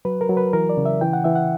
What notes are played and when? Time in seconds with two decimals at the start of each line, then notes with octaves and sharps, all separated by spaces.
0.05 F#3 B4
0.21 A#4
0.29 F#3
0.37 B4
0.53 E3 A#4
0.69 D5
0.77 C#3
0.86 E5
1.01 E3 G5
1.13 F#5
1.24 E3 E5
1.36 F#5